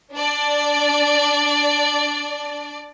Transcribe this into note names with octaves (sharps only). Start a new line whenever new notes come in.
D4 D5